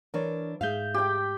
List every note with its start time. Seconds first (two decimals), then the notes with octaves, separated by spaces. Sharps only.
0.14 E3 D4 A#4 C#5
0.61 G#2 G#4 E5 F5 G6
0.94 G4 G5